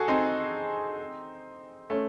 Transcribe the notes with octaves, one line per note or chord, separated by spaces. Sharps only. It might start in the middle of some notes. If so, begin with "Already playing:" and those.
Already playing: F#4 G#4 A4
C4 D#4
A3 C#4